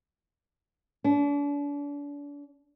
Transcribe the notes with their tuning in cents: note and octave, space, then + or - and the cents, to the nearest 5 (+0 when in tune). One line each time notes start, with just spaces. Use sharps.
D4 -40